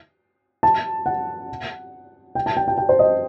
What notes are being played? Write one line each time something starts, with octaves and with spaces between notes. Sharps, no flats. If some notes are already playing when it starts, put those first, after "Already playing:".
A5
F#5
G5
A5
G5
G5
G5
C5
D#5